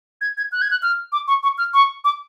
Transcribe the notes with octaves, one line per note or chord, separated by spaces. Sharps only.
G#6
G#6
F#6
G#6
F#6
F6
D6
C#6
C#6
F6
C#6
D6